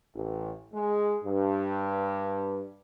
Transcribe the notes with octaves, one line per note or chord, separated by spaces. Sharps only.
A1
G#3
G2